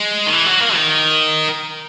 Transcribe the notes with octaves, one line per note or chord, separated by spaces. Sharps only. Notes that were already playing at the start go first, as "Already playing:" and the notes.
Already playing: G#3
D#3
E3
F#3
A#3
D#3